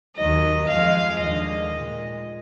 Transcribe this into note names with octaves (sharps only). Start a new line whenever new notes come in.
D#2 D#3 F#3 D#5
F2 F3 G#3 F5
D#2 D3 G#3 D#5
A#2 G#3